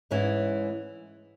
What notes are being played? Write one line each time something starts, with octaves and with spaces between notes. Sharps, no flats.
G#2 E3 G#3 C#4